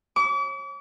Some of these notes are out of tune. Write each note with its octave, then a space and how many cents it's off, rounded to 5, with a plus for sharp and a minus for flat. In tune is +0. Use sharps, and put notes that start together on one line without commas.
D6 -40